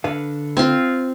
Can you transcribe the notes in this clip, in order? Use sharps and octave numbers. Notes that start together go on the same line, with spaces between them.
D3 B4 F5
C4 F4